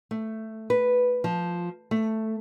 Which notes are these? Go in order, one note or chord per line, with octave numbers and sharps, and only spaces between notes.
A3
B4
F3
A3